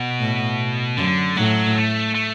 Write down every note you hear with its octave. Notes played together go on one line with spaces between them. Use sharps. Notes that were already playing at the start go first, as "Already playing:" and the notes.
Already playing: B2
A2
F#2 D3
A2 F#3
A3
A3